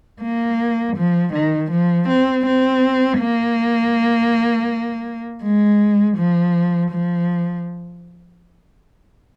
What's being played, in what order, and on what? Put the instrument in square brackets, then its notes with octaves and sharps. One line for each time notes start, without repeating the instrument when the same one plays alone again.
[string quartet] A#3
F3
D#3
F3
C4
C4
A#3
G#3
F3
F3